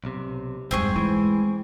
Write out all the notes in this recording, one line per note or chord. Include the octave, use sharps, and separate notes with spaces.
B1 C3
F2 G#2 G3 C4 G#4 C#6
E3 G#3